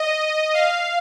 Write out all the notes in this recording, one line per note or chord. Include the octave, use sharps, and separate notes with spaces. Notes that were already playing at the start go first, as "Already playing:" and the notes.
Already playing: D#5
F5